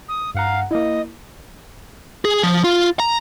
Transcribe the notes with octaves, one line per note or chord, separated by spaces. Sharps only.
D#6
G2 F5 F#5 A#5
A#3 E4 D#5
G#4
F3
F4
A#5